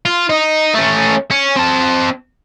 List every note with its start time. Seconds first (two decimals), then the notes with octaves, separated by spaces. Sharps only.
0.05 F4
0.29 D#4
0.74 A3 C#4
1.31 C#4
1.56 C4 A5